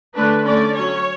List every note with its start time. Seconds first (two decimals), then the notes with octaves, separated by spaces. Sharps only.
0.16 D3 A3 D4 B4
0.45 D3 A3 C#4 D5
0.75 F#3 C#4 C#5